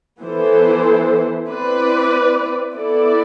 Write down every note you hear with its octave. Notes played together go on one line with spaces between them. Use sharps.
E3 B3 E4 A4 C5
C4 E4 B4 D5
B3 E4 A4 D5